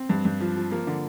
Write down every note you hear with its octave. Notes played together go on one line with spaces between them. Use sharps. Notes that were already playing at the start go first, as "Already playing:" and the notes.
Already playing: C4
G2
G2
F3
F3
F3 A#3
D3